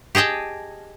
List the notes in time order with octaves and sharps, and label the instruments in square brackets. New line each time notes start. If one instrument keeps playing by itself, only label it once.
[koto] G4 G#4 D#5 G5 A5